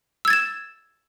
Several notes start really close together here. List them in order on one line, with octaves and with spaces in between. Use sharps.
E6 G#6 A6 E7